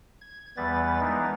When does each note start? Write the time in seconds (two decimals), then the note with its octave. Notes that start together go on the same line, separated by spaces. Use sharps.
0.21 G#6
0.57 E2 E3 G3 B3 B4 A6
1.00 E3 G#3 B3 D4 D#4 A#4